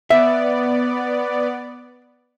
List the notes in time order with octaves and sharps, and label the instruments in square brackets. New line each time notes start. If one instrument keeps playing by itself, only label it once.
[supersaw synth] B3 D5 [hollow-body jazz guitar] E5